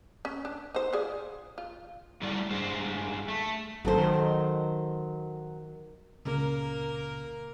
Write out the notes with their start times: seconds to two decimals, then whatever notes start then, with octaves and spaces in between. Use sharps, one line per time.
0.25 C#4
0.45 D4
0.75 D#4 C5
0.93 F4 G#4 D5
1.58 F4
2.22 A2 F#3 G3 D5
2.50 G2 G#3 C5
3.28 A3
3.85 G#1 F#3 A4 C5
3.98 D#3
6.25 C#2 A#2 C#3 A#3 A#4